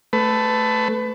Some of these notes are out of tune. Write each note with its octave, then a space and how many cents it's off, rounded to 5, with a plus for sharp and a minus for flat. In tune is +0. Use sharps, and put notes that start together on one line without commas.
A3 +0 B4 +25